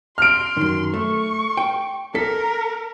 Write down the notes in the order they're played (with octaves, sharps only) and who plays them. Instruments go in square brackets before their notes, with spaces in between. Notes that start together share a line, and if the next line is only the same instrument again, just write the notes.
[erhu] C6 [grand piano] F6 D7
[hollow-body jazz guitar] F#2 D#3
[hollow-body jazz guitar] A3 [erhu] C#6
[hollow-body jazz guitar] G5
[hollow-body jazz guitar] A4 [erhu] A#4 [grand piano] B6